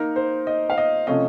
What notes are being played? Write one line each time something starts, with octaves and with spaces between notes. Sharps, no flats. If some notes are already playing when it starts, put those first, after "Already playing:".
Already playing: D#3 A#3 D#4 A#4
C5
D#5
F5
D#5
C3 F3 A3 C#4 D#5